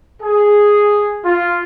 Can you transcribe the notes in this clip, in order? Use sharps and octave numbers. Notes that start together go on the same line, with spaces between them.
G#4
F4